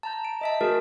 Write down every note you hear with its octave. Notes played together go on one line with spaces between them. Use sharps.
A5 A#5 G6
D7
D#5 E5 A5
A3 F#4 G#4 A#4